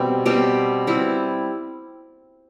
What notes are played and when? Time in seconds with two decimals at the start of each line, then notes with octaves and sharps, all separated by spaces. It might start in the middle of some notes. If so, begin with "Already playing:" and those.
Already playing: B2 G3 C4 G4
0.26 B2 G3 C4 G4
0.87 G3 C4 E4